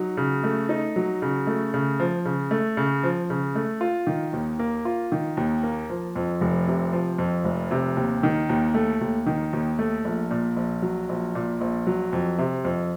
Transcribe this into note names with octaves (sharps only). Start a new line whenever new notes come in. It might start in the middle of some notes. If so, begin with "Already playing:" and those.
Already playing: F#3 D#4
C#3
A3
D#4
F#3
C#3
A3
C#3
F3
C#3
A3
C#3
F3
C#3
A3
F4
D#3
D#2
A#3
F4
D#3
D#2
A#3
F3
F2
F1
C3
F3
F2
F1
C3
D#2
D#3
D#2
A3
D#2
D#3
D#2
A3
A#1
A#2
A#1
F#3
A#1
A#2
A#1
F#3
F2
C3
F2